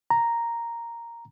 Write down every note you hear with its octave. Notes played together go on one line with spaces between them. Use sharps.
A#5